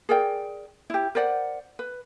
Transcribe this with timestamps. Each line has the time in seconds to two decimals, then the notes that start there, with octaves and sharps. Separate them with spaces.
0.09 G#4 A#4 D5 G5
0.90 E4 G4
1.15 A#4 C5 D5 F#5
1.79 B4